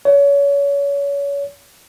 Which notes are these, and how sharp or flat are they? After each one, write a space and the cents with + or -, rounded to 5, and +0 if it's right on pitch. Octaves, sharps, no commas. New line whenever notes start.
C#5 +30